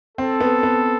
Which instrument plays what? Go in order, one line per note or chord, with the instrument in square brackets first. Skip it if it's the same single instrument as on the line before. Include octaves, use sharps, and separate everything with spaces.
[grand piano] C4 [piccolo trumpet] A4
[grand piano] B3
B3